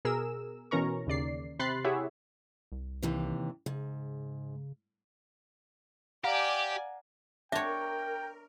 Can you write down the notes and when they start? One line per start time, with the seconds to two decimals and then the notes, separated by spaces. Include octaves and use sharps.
0.05 B2 G#4 A#4 E6 E7
0.71 B2 E3 C#4 A#4 A#5 C#6
1.07 D#2 C#3 D5 C7
1.59 C3 B5 C6 F#6 A6 C7
1.84 E4 G4 G#4 C#5 E5 F#5
2.72 C2
3.03 D#2 C3 E3
3.66 G#2 C#3
6.24 G4 D5 F5 F#5 G#5 A#5
7.52 D4 A#4 C#5 E5 G5